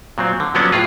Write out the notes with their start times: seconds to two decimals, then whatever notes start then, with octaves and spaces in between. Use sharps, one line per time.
0.18 A#2 F#3 C4
0.40 D3
0.55 F3 F#3 A#3 B3 C#4 D4
0.72 A2 F4 G#4